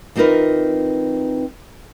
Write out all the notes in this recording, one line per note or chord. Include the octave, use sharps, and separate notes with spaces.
E3 C4 D#4 F4 A#4 B4